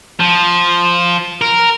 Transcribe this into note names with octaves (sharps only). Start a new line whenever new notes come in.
F3
A#4